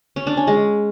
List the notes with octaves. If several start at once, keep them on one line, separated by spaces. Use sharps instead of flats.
C#4
D4
C#4
G#3